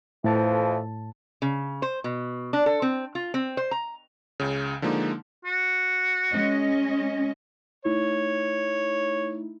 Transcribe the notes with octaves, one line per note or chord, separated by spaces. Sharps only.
F2 A2 E3 F3 A5
C#3
C5
B2
D4
A4
C4
F4
C4
C5
A#5
C#2 C#3
D3 F3 G#3 A#3 D#4
F#4
G#3 C#4 D#5
A3 D#4 E4 C#5